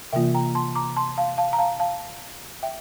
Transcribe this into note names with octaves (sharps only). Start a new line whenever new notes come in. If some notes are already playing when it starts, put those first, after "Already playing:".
C3 E3 A#3 F4 E5 G5
G5 A#5
A5 C6
A#5 D6
A5 C6
F5 A5
F5 A5
A#5
F5 A5
F5 A5
E5 G5